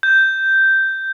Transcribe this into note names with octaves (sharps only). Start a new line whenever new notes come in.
G6